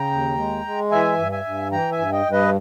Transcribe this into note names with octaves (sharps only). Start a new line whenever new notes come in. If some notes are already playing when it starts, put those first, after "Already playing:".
Already playing: C#3 G5 A#5
D#2
G#3
G#3
E3 E5 G#5
G2
E5 G#5
G2
E3 G5 A#5
E5 G#5
G2
D#5 G5
G2
B4 D#5